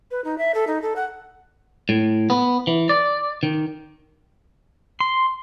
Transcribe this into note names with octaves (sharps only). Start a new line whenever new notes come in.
B4
D#4
E5
A4
D#4
A4
F#5
A2
B3
E3
D5
D#3
C6